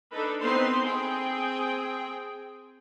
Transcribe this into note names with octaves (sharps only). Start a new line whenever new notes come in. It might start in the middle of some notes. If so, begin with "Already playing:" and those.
D4 D#4 A4 B4
B3 C4 D#4 B4 C5 C6
C4 G#4 G5